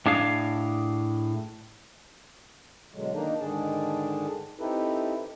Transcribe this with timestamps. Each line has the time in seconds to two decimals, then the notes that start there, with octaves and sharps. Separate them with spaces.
0.06 A2 D4 G#4 F5
2.93 B2 D3 F#3 G#3
3.13 D#3 A#3 D4 D#4
3.40 G#2 D3 D#3 D4 G#4 A5
4.59 C4 D#4 E4 G4 A4 B4